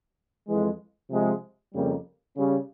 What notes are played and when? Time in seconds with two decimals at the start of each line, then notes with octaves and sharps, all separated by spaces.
0.48 F2 E3 G#3
1.11 C3 F3 G#3
1.73 F2 C#3 G3 A#3
2.36 C#3 G3 C#4